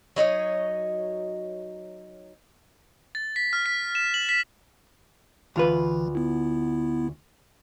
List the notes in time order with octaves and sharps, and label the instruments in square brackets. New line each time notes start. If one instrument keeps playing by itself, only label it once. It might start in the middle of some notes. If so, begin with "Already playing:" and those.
[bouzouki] F#3 D#4 C#5 D#5
[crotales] A6
B6
F6
B6
E7
F#7
B6
[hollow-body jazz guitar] D2 F4 B4 [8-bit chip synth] E3
[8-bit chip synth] B3 E4